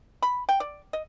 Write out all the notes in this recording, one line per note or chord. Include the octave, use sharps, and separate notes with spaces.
B5
G5
D5
D#5